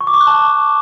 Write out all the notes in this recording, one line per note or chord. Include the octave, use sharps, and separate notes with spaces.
C#6
D6
C#6
F#6
A5